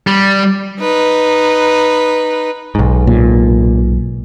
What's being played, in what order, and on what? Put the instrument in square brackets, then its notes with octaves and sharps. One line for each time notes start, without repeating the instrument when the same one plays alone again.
[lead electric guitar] G3
[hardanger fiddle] D#4 B4
[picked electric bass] B1 G#2
[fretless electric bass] A#2